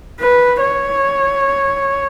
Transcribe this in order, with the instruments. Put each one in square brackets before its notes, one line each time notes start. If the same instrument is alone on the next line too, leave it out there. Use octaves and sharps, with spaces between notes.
[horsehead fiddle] B4
C#5